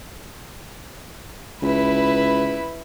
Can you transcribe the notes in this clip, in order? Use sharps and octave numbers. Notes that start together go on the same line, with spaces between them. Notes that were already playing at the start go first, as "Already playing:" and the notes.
C#2 E4 B4